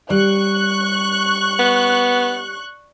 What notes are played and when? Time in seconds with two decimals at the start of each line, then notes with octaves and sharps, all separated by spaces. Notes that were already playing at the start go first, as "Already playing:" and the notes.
0.10 G3 C#6 F#6
1.59 B3